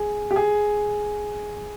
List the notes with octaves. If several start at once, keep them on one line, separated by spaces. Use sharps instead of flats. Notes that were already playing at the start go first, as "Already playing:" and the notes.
Already playing: G#4
G4
G#4